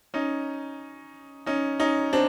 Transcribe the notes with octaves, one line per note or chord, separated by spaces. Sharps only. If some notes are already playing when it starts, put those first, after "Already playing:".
C#4 D#4
C#4 D#4
C#4 D#4
C4 D4